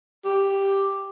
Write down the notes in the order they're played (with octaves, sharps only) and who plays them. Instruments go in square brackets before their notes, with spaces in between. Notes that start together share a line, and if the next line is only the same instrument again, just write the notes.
[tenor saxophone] G4